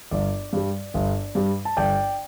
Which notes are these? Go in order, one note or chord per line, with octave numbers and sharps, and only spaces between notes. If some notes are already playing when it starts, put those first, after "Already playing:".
G1 D5
G2 G3
G1
G2 G3
A5
G1 D5 G5